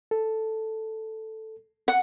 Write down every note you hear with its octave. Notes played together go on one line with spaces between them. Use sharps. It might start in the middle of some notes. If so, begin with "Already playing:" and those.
A4
F#5